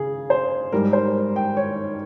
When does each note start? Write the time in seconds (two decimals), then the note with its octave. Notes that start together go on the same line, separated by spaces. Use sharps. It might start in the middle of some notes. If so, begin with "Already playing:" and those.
Already playing: C#3 G#4
0.30 C5
0.72 G#2 G3 A#4
0.93 C5
1.36 G5
1.57 C#5